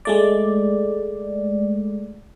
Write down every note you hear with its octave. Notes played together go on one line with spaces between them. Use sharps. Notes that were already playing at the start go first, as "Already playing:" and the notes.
G#3 A3 D5